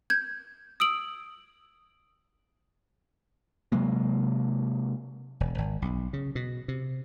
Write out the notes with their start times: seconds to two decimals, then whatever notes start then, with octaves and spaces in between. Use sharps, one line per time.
0.10 G6 G#6
0.80 D#6 E6 D7 F#7
3.72 C3 F#3 G#3 A#3
5.40 E1
5.58 G#1
5.82 B1
6.13 C#3
6.35 B2
6.68 C3